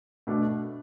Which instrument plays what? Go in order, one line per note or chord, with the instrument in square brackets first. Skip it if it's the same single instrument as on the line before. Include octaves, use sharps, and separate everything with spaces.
[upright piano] B2 A3 D4